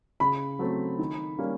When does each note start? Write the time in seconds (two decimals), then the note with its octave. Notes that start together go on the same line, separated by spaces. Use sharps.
0.20 C#3 B5
0.59 F#3 A3 C4
0.99 D#3
1.39 G3 A#3 C#4